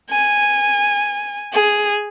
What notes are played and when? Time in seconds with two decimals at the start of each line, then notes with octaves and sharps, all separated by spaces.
0.10 G#5
1.53 G#4